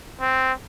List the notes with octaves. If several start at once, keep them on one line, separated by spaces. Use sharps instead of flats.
C4